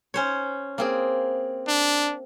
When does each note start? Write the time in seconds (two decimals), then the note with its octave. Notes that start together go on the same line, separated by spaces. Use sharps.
0.14 C#4 C5 C#5
0.78 A#3 C4 G#4
1.67 D4